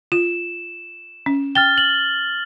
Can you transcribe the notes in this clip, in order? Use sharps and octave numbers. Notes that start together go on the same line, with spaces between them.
F4 E7
C#4
G5 F6 A6 G7
F#7